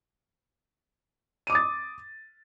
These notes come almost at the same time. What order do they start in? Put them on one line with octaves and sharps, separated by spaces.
D#7 D6 D#6 A6